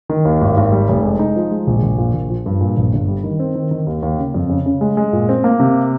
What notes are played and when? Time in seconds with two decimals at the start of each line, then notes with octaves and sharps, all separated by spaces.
0.09 D#3
0.25 D#2
0.42 G#1
0.57 G#1
0.72 G3
0.89 F1
1.04 G#3
1.19 D#4
1.36 F3
1.51 G#3
1.67 A#1
1.83 A#1
1.98 A#2
2.14 A#1
2.30 F3
2.46 G2
2.61 A#2
2.77 A#1
2.93 G1
3.08 G3
3.24 D#3
3.40 C4
3.55 D#3
3.71 D#3
3.87 D#2
4.02 D#2
4.18 C#3
4.34 F2
4.49 C#3
4.66 C#3
4.81 G#3
4.97 G#3
5.13 A#2
5.29 C4
5.44 A#3
5.60 C3